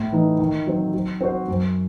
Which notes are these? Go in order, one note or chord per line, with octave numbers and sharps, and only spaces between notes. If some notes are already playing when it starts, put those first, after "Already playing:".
Already playing: A2
E3 A3 D#4
D#3
F#3 C4
F#3
C4 F#4 C5
F#2